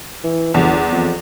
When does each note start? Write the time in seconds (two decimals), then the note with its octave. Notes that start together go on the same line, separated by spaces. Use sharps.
0.24 E3
0.54 G1 E2
0.92 F2